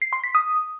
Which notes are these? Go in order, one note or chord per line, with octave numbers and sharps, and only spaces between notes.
C7
C6
B6
D#6